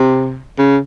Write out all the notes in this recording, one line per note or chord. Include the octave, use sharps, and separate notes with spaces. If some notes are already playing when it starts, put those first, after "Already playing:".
Already playing: C3
C#3